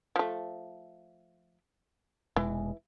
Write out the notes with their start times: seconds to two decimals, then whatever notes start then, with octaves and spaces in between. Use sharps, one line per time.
0.16 F3 A3
2.36 F1 B2 E3 G#3